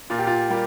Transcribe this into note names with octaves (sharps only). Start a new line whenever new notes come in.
A#2 F4
G4
F4
G3 A#3 G4